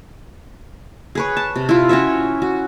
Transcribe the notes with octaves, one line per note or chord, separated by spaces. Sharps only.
G#4 B4 C#5
A5
C3
E4 F4
C#4 F#4 C#5 E5
F#4